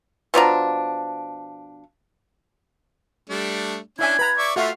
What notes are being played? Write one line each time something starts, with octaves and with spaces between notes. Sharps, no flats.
B2 F3 D4 A#5
G3 A3 D4
C#4 D4 E4 E5 G#5 G#6
B4 A#5 B5
D5 E5 C#6
A3 F4 F#4 E5 F5